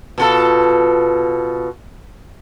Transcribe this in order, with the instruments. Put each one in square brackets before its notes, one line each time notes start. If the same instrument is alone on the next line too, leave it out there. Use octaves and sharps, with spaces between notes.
[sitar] B2 F4 A4